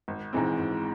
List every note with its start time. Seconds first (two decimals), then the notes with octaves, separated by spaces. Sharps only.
0.08 G#1
0.33 G#2 E3 G#3 C4
0.58 G#1